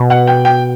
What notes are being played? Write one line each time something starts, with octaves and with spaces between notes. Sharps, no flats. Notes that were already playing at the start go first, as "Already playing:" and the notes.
Already playing: B2
F#5
G5
G5